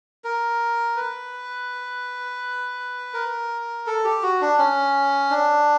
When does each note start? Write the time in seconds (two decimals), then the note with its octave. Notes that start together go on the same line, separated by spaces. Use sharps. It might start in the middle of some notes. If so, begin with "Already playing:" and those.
0.24 A#4
0.96 B4
3.14 A#4
3.87 A4
4.04 G4
4.23 F#4
4.41 D4
4.58 C#4
5.31 D4